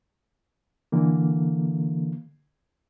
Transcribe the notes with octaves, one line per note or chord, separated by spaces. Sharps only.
D3 E3 A#3